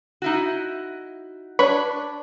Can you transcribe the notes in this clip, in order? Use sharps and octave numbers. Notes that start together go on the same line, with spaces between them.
D#4 E4 F#4
D4 B4 C#5 B5 C#6